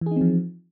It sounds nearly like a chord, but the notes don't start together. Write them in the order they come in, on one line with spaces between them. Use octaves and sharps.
E3 G#4 D#4 C4 F3